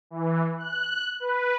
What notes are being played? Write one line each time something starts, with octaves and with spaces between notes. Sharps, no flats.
E3
F#6
B4